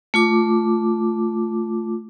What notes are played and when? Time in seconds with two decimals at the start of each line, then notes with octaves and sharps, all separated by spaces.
0.14 A3 F4 D6